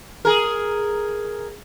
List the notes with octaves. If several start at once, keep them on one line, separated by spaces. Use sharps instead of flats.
G#4 A#4